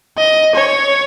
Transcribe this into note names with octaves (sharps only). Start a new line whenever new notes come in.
D#5
C#5